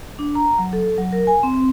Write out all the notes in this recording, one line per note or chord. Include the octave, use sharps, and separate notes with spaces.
D4
A#5
F#3
A4
F#3
A#4
G#5
C4